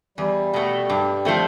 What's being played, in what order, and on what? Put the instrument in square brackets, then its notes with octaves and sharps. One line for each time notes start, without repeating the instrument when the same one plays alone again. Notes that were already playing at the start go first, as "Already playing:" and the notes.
[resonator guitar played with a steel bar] E2 [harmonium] G3
[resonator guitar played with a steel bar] B2 A3
G2
F3 A3 C4